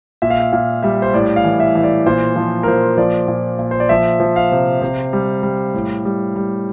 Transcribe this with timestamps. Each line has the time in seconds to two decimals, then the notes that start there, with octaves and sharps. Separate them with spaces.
0.22 A#2 E5
0.30 F5
0.40 E5
0.53 A#2 F5
0.83 G3 E5
1.02 C5
1.13 A2 D5
1.36 F5
1.44 E3
1.60 E5
1.75 E3
1.83 D5
2.06 A#2 C5
2.36 F3
2.63 A#4
2.68 A#2 C5
2.97 F3 D5
3.28 A#2
3.59 A#2
3.71 C5
3.80 D5
3.89 F3 E5
4.20 F3
4.36 F5
4.52 C3
4.82 C3
5.13 G3
5.43 G3
5.74 A2
6.05 G3
6.36 G3